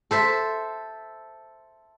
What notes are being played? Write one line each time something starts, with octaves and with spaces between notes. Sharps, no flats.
A4 C5 E5